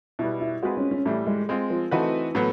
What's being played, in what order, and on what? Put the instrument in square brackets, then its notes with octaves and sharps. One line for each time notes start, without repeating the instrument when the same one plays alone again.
[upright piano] B2 G3 B3 [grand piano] E4
[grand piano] E4
[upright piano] G#3 C4 F4 G#4 B4 [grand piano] F#4
[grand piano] C#4
C#4
[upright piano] A2 E3 G3 [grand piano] A3
[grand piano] G#3
[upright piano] G#3 C4 F4
[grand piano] F3
[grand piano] E3 [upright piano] A3 C4 D#4 F#4 B4
[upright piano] A2 F#3 B3